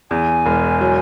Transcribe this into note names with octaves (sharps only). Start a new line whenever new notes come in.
E2 G#5
E1
F#3